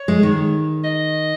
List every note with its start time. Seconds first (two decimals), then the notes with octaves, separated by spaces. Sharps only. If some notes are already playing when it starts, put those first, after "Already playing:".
Already playing: C#5
0.08 G#3
0.23 D#3
0.84 D#5